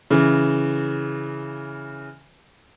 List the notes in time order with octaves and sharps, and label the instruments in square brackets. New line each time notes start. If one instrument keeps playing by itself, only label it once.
[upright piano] C#3 E3